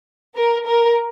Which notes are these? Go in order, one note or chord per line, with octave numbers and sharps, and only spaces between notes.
A#4
A#4